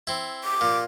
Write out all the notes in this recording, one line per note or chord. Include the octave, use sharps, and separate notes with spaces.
C4 E4
D6
A#2